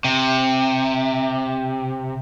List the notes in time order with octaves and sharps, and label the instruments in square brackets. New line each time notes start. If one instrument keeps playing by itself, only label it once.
[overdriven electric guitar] C3